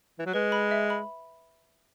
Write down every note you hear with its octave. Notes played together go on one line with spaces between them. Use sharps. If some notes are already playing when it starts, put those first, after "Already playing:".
E3
F#3
G#3 B4
B5
E5
B5